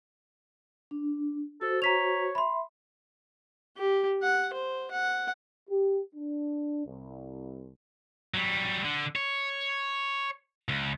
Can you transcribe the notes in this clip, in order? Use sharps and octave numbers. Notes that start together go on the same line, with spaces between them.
D4
F#4 A4 C5
C#5 A#5 B6 F7
E5 B5 C6
G4
F#5
C5
F#5
G4
D4
C2
F#3 G3
D3
C#5
C#2